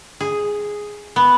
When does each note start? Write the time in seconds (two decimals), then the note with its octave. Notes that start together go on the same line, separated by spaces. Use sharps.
0.20 G#4
1.16 B3